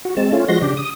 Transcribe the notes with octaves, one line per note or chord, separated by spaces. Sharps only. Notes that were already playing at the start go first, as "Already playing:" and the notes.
F#4
G#3 C4 A5
A3 C#4 F4
F3 G#3 F#4 C6 A#6
C#3 D4 G4
D#6